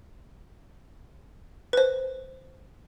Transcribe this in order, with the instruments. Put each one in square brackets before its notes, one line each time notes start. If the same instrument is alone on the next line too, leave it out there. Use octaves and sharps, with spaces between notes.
[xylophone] B4 C5